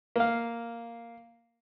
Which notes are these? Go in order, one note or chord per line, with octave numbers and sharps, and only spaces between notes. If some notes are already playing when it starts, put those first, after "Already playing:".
A#3 F5